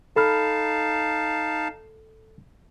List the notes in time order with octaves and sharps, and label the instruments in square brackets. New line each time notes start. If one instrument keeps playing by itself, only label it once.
[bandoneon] D#4 F5 A5 [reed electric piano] A4 B5 F6